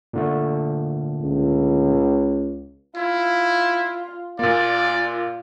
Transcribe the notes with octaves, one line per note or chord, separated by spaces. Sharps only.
A#2 D3 A3
C#2
E4 F4
A#2 A#3 F4 D5